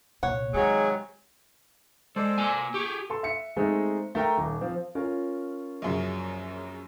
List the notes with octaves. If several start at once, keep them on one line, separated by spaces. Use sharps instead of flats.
C2 A#2 C#5 F#5
C3 D#3 F#3 G#3 G#4
G#3 A4 C5 D5
A#3 G#5
G4 G#4 C#6 D6
A4 C6
E5 C#7
G#3 A3 C4 D#4
A3 A#4 G5 A#5
D#1
F3 C4
C#4 F4 A#4
A#1 F#2 C#3